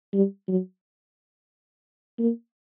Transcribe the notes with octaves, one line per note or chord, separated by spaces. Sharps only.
G3
F#3
A#3